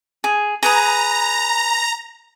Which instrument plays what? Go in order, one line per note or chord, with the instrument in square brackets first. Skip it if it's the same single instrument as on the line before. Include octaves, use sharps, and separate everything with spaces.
[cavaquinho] G#4
[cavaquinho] G#4 B4 D#6 [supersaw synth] A#5